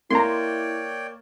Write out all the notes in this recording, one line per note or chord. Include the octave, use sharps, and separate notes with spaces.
A#3 E4 C#5 D5 G5 A#5 C6